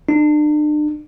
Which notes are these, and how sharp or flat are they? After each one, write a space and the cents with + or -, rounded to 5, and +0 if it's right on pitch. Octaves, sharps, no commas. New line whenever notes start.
D4 +40